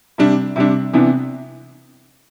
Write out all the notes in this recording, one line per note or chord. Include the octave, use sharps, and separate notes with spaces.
C3 G3 D4
C3 G3 D4
C3 E3 B3 D4